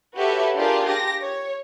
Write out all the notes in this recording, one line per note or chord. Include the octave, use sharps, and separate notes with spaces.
F#4 G4 A4 B4 C#5 E5
D4 F4 G4 G#4 A#4 D5
G4 A#6
C#5